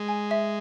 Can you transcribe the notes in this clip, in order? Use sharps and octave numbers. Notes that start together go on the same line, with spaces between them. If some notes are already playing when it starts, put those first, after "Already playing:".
Already playing: G#3
G#5
E5